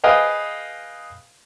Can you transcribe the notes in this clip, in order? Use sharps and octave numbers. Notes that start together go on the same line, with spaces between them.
G#4 B4 D#5 F5 G5